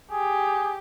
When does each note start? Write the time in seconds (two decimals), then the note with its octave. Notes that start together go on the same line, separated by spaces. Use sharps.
0.11 G4 G#4